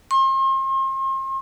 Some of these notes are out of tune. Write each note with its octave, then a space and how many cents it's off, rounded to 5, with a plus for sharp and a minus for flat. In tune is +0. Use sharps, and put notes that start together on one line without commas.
C6 +40